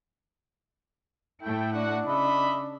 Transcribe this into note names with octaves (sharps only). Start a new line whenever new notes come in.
A2 A3 E4 G5
D4 F#4 F#5
C#3 D#5 E5 B5